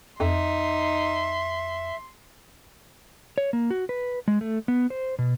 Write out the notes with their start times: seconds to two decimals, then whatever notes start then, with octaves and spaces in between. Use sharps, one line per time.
0.20 F2 D#4 E5 C6
3.38 C#5
3.53 A#3
3.71 F#4
3.89 B4
4.28 G#3
4.41 A3
4.68 B3
4.90 C5
5.19 B2